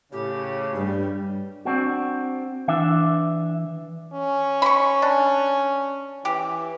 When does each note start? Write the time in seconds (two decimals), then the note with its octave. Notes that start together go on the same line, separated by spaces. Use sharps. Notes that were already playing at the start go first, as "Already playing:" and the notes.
0.12 A2 C#3 G4
0.74 G2 G3
1.65 C4 D4 F#4
2.68 E3 D4 E5
4.13 C#4
4.62 B5 C#6
5.02 D4
6.25 E3 G4